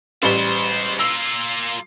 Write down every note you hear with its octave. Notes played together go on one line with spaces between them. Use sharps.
A1 G3 G#3 C5 G7
A#3 F4 E6